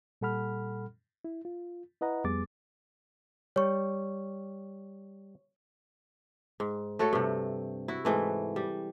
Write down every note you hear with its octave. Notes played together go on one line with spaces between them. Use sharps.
A#2 G3 A4 F#5 B5 F6
E4
F4
E4 B4 D#5 F#5 A#5
F2 G3 B3 G#4 D6 A6
G3 C#5 C#6
G#2
A3 F#4 A4 C#5
G2 C3
E4 F#4
G#2 E3 A3
G3